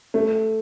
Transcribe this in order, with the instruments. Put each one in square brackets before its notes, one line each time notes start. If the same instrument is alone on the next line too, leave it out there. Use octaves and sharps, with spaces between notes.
[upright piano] A3